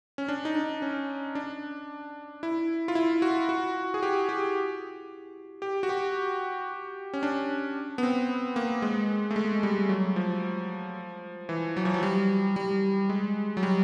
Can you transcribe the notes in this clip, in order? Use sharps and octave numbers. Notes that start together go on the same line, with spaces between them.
C#4
D4
D#4
D4
C#4
D4
E4
F4
E4
F#4
F#4
G#4
G4
G4
G4
F#4
G4
C#4
D4
B3
C4
A#3
G#3
A3
G#3
G3
F#3
F3
E3
F#3
F3
F#3
G3
G3
G#3
F#3
G3